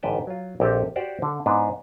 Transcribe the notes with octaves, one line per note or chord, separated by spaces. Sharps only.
A1 G#2 D3 B4 G5 A5
F#3 F4
A#1 C4 G4 A4 D#5 F5
F#4 G4 C5 D5 F#5
D3
G#2 B3 D4 E4 D#5